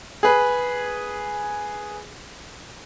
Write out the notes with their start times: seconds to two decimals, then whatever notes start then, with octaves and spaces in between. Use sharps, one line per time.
0.23 G#4 B4